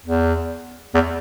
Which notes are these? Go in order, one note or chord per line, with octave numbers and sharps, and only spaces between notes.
E2
E2